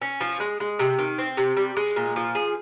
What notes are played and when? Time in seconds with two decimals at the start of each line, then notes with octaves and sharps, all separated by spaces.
0.02 C#4
0.21 F3
0.40 G#3
0.60 G#3
0.79 C3
0.99 D#3
1.18 C4
1.37 C3
1.57 G3
1.77 G#3
1.96 A#2
2.16 F3
2.35 G#4